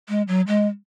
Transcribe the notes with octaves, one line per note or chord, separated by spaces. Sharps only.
G#3
F#3
G#3